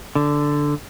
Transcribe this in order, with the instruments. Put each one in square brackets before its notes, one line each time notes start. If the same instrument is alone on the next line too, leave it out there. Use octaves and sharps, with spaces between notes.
[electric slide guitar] D3